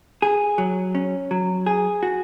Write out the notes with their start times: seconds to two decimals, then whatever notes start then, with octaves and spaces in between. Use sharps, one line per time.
0.22 G#4
0.58 F#3
0.95 C#4
1.31 F#3
1.66 G#4
2.03 F#4